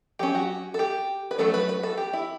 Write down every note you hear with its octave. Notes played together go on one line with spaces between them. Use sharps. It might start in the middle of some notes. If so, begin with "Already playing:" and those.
F#3 C#4 G4
F#4
A4
G4
B4
F#3 A3 C#4 A4
B4
B4
A4
G4
E4